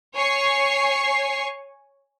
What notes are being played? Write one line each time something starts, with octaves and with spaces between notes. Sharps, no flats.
C#5 G#5 C#6 C7